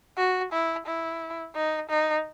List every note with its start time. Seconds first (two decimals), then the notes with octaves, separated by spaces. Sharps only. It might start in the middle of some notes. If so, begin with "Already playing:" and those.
0.18 F#4
0.52 E4
0.86 E4
1.55 D#4
1.90 D#4